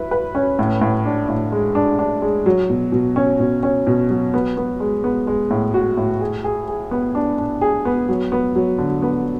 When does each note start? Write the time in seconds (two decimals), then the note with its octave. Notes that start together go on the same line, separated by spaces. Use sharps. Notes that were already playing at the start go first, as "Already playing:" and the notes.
Already playing: F#3 E4 B4
0.11 B4
0.35 C#4
0.59 A2
0.81 A2
1.05 D4
1.29 A2
1.52 G#3
1.75 D4
1.99 D4
2.22 G#3
2.46 F#3
2.70 B2
2.92 B2
3.16 C#4
3.40 B2
3.63 C#4
3.87 B2
4.10 F#3
4.34 B3
4.57 B3
4.80 G#3
5.04 B3
5.27 G#3
5.51 A2
5.74 F#4
5.97 A2
6.21 G#4
6.44 G#4
6.68 G#4
6.91 B3
7.15 D4
7.38 D4
7.61 G#4
7.85 B3
8.09 F#3
8.32 B3
8.55 F#3
8.78 D3
9.02 B3